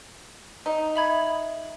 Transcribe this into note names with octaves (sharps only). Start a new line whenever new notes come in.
D#4
E5 B5 G#6